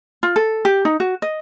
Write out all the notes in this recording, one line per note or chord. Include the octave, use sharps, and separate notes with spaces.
F4
A4
G4
D#4
F#4
D#5